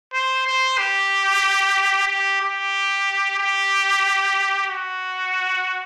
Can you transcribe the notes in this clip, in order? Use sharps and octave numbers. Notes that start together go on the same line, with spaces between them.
C5
C5
G4
G4
G4
G4
F#4